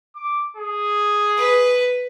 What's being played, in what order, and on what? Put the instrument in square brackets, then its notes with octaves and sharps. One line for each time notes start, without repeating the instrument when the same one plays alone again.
[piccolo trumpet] D6
G#4
[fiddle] B4